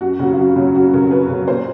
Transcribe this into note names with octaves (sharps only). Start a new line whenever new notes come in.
F#2 F#4
C#3 F#3 F#4
F4
F#2 F#4
C#3 F#3
F#2 F#4
C#3 F#3 A#4
F#2 B4
C#3 F#3
A#2 C5